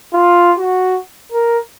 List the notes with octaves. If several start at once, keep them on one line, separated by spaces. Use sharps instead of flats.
F4
F#4
A#4